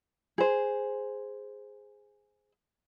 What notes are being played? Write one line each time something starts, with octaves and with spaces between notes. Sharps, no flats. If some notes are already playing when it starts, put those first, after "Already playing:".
G#4 C5